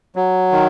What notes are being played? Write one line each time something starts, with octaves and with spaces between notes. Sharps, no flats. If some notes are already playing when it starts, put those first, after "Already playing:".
F#3
D#3